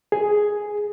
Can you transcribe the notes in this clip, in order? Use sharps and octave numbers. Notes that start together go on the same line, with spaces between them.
G#4